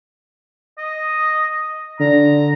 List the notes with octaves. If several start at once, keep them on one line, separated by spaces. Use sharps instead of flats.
D#5
D3 A#5